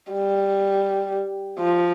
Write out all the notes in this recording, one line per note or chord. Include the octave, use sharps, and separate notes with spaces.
G3
F3